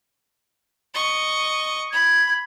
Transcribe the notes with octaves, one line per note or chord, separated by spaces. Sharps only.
D#5 C#6
B5 G#6